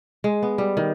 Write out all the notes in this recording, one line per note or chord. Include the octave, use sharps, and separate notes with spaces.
G#3
B3
G3
D#3